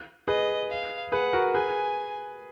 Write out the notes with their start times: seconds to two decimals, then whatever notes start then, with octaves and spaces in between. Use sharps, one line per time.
0.28 G#4 B4 D#5
0.70 F5
1.12 G#4 B4 F#5
1.33 F#4 A#4
1.54 G#4 B4 G#5